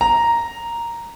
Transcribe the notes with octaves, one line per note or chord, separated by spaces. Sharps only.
A#5